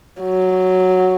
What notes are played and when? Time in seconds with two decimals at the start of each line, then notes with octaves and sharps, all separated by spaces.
0.21 F#3